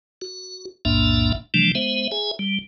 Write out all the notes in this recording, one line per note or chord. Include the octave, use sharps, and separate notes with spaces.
F#4
B1 F2 A2 A#3 D4 E5
C3 E3 F3 G3 A3 D4
G#3 B3 C5 E5
G#4 E5 G#5
G3